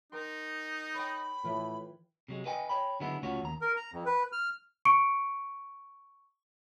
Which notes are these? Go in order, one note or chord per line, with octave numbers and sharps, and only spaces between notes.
D#4 A#4 G5 C6
C#5 G5 B5
A2 E3 F4 B4
C3 F#3 G#3
B4 D#5 G5 G#5
C#5 G5 B5
D3 F#3 G#3 B3 E4
C#2 A3 C#4 F4 F#4 C#5
D#2 A#5
A#4
A#5
F2
B4
F6
C#6 C#7 D7